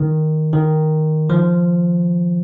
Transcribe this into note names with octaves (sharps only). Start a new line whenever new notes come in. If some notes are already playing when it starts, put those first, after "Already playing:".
Already playing: D#3
D#3
F3